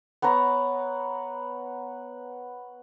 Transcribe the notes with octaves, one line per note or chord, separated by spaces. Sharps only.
B3 B4 C#5 A#5